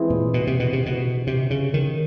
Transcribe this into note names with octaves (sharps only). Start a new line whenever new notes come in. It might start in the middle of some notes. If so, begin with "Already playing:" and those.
Already playing: E3 G#3 C4
A#2
B2
C3
B2
C3
B2
C3
C#3
D#3